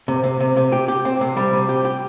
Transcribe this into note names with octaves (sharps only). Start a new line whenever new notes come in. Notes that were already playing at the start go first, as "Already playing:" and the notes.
C3
C3
C3
C3
G4
G4
C4
C3
G3
C3
G4
G4